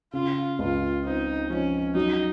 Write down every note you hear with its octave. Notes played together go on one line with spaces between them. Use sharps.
C#3 F4
C#2 F4
C4 D#4
F3 C#4
F#3 D#4